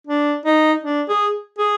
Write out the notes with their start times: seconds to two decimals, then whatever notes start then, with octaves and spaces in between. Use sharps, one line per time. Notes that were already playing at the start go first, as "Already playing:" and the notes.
0.07 D4
0.46 D#4
0.84 D4
1.09 G#4
1.59 G#4